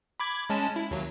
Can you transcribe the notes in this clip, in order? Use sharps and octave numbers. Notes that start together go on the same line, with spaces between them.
B5 D6 G#6
G#3 C#4 A5
E4
D#2 F#3